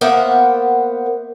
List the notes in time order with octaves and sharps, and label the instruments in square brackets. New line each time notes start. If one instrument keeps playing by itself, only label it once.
[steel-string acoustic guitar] A#3 B3 A#4 C5 E5 F#5